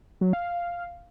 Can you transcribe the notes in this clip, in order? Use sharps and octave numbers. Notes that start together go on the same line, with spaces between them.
F#3
F5